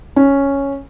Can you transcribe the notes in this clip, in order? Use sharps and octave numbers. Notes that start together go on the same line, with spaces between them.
C#4